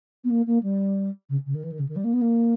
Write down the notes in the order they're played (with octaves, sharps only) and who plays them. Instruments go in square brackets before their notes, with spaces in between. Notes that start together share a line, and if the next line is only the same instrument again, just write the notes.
[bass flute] B3
A#3
A#3
G3
C#3
C#3
D#3
E3
D#3
C#3
D#3
G3
A#3
B3
A#3